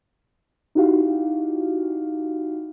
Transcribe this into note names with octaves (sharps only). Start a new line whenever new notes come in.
D#4 E4 F#4 G4 F5